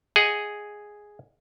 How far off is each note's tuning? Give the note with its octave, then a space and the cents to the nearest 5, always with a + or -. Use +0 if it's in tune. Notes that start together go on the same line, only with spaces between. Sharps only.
G#4 +0 D#5 +0 F#5 +20